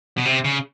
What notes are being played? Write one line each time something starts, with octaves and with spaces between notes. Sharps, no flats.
B2
C3
C#3